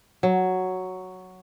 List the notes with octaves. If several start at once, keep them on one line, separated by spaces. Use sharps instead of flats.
F#3